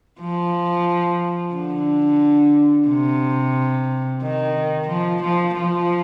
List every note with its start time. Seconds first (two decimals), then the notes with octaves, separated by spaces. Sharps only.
0.21 F3
1.54 D3
2.88 C3
4.22 D#3
4.88 F3
5.23 F3
5.55 F3